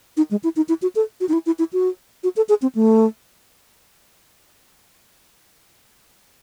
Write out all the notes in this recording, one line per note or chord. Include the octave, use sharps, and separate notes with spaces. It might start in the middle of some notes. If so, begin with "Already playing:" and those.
D#4
G#3
E4
D#4
E4
F#4
A4
F#4
D#4
E4
E4
E4
F#4
F#4
A4
G#4
C4
A3